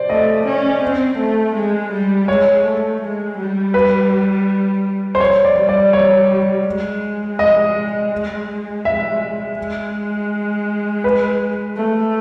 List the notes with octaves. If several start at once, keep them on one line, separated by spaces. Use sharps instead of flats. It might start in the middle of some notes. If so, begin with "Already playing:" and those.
Already playing: C5 D5
A3 D#5
C#4
C4
A3
G#3
G3
G#3 C#5
A3
G#3
G3
B4
C5
C#5
D5
G3
D5
C#5
G#3
D#5
E5
G#3
B4
A3